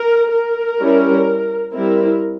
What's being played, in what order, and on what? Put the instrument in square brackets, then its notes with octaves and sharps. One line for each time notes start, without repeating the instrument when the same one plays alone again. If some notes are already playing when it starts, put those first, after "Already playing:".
Already playing: [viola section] A#4
A#4
G3 C#4 E4
G3 C4 E4 A#4